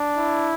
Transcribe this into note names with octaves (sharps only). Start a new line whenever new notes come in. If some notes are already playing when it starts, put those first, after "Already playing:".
Already playing: D4
E4